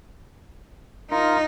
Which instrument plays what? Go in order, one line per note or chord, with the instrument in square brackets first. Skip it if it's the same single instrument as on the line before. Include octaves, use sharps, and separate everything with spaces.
[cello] D#4 [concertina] F4 A#4